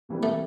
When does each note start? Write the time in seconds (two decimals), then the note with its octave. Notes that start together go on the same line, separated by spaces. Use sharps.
0.09 C3 E3 G3 A#3
0.23 A3